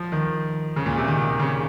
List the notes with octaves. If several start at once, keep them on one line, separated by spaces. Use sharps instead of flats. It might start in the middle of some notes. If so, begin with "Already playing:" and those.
Already playing: F3
D#3
C#3
A#2
C3
D#3
D#3
C#3